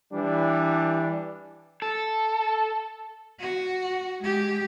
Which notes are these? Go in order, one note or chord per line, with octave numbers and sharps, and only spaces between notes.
E3 G3 D4
A4
F#4
G#3 G4